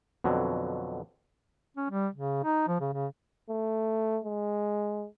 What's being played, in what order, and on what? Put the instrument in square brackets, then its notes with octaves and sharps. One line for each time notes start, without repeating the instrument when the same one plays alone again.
[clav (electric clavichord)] F2 B2 D3 F#3
[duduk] C#4
G3
C#3
D#4
F3
C#3
C#3
[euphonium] A3
G#3